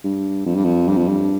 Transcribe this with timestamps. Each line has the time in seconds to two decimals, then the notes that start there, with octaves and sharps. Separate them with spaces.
0.04 G2
0.46 F2
0.55 G2
0.65 F2
0.88 G2
0.97 F2
1.08 G2